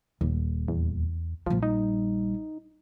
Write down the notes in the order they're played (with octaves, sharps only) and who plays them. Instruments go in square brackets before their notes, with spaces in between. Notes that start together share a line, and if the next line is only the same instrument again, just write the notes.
[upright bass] D#1 [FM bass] D#2
[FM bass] E2
[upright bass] A#1 G3 [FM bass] F3
[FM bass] D#4